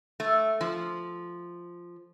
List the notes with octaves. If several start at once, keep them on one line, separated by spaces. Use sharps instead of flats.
A3
F3